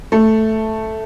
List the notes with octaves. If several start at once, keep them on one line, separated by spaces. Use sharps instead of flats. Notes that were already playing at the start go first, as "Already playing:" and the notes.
A3